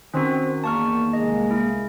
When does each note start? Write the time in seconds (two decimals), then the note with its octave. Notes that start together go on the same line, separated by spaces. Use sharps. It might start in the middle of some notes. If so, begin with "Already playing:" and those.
0.14 D#3 C4 C#4 F#4
0.64 E2 A#3 A5 C#6 F6
1.13 C2 G#3 D#5
1.51 E4